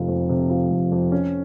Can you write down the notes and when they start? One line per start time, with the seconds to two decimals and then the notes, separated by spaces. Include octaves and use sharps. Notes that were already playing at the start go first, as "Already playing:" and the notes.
Already playing: F1 C3 F3
0.08 F2
0.29 C3
0.50 F3
0.70 F1
0.92 F2
1.12 C#4